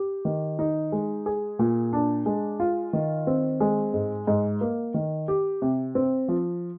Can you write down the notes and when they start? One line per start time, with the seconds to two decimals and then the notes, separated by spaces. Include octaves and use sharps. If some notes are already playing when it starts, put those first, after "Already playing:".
Already playing: G4
0.25 D#3
0.59 D#4
0.92 G#3
1.26 G#4
1.59 A#2
1.93 D4
2.26 G#3
2.60 F4
2.93 D#3
3.27 C4
3.60 G#3
3.94 G#2
4.27 G#2
4.61 A#3
4.94 D#3
5.28 G4
5.62 C3
5.95 C4
6.28 F3